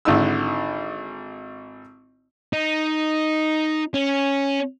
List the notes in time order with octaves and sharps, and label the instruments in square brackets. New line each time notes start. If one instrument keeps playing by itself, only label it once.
[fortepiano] G#1 D3 D#4 E4 E6
[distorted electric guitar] D#4
C#4